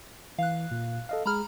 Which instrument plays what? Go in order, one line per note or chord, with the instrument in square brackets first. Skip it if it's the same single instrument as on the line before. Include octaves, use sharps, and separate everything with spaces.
[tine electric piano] E3 [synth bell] F5 F#6
[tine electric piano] A#2
A4 D#5 F5
[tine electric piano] G#3 G#4 [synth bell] A#5 B5 F6